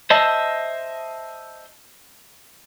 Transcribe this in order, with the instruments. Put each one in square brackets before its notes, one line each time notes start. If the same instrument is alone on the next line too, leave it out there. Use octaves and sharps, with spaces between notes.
[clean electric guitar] C5 D#5 E5 A5